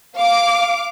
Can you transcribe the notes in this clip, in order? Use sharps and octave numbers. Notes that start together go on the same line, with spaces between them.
F5 D6